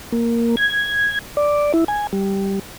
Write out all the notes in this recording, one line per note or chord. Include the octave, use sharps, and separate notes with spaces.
A#3
G#6
D5
E4
G#5
G3